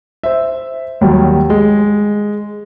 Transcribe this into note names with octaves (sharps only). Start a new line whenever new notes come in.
C5 E5
D#2 F#3 G3
G#3